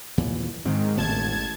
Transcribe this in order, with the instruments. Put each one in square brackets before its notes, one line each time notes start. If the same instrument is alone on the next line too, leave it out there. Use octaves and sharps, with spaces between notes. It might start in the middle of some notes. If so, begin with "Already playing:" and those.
[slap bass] D#2 A#2 E3
[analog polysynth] G#2 D#3 [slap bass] C4
[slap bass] E1 A2 [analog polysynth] A1 A5 G#6